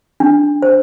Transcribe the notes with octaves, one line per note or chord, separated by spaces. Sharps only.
D4
C5